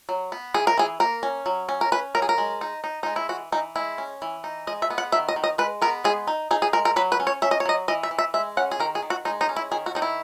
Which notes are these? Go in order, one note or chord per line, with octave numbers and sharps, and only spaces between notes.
F#3
B3
E3 G#4
A#4
E3 G#4
A#3 A#4
C#4
F#3
C#4
A#4
C#4 B4
F#3 A#4
G#4
A#4
G#3
D#4
D#4
G#3 D#4
E4
E3 F#4
E3 D#4
G#3 E4
C#4
E3
D#4
G#3 D#5
E5
B3
F#5
D#3 E5
D#5
D#3
D#5
G#3 B4
B3 A#4
G#3 G#4
D#4
D#4 G#4
G#4
G#3 A#4
A#4
F#3 B4
B4
C#4
C#5
C#4 E5
D#5
C#5
F#3 D#5
E3 D#5
E5
E3
E5
G#3 E5
C#4 F#5
G#4
D#3 A#4
G#4
D#3
F#4
G#3 D#4
D#4
C#4
E4
D#3 G#4
F#4
D#3 D#4
E4